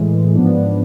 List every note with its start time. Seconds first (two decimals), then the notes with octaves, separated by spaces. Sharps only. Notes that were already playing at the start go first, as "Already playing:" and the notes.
Already playing: A2 E3 G#3
0.35 G#2 F3 B3 D4